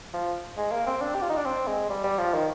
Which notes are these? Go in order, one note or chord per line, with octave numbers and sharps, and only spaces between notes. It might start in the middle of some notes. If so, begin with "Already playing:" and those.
F3
G#3
A#3
C4
D4
G4
F4
D#4
D4
C4
G#3
G3
G3
F3
D#3